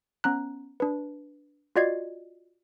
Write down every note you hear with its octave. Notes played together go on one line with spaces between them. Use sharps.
B3 C#4 A#5 F#6
D4 B4
F4 F#4 D5 D#5 G#6 C7